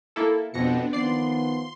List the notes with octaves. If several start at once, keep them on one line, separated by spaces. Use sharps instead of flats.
A#3 E4 A4
F2 B2 B3 C4 D4 A#6 C#7
D#3 F3 B3 D5 C6 C7